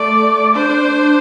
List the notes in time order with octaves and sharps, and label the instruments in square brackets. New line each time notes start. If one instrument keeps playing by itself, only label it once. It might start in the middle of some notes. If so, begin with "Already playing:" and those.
Already playing: [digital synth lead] A3 [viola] D5
[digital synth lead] D4 [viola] C5
[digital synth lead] D4